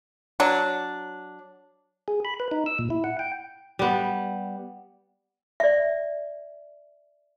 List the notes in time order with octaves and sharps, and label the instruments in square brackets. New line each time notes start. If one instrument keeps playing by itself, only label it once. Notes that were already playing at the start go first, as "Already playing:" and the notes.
[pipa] F#3 D4
[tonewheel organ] G#4
B5
B4
D#4
E6
A#2
E4
F#5
G5
[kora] G3 B3
[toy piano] D5 E5